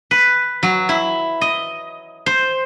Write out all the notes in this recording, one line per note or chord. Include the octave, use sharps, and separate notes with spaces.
B4
F#3
E4
D#5
C5